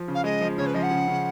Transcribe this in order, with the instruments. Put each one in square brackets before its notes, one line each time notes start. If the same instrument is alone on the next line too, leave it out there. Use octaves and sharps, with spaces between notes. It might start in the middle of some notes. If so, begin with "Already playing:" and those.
Already playing: [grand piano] F3
C#3
[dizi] F5
[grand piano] G#3 [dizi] D#5
[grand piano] F3
[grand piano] C#3 [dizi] C#5
[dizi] B4
[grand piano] F3 [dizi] D#5
[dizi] F#5
[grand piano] C#3
C#3